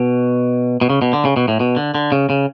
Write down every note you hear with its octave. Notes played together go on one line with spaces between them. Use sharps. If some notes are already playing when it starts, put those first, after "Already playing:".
Already playing: B2
B2
C#3
B2
D3
C#3
B2
A2
B2
D3
D3
C#3
C#3